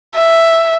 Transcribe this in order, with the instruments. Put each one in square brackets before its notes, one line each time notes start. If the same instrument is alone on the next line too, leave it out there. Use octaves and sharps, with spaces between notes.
[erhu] E5